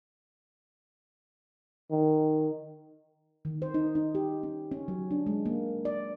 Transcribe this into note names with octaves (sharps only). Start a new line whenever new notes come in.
D#3
D#3
C5
D#4
D#4
G4
C#4
C#4
F#3
D4
G#3
A#3
D5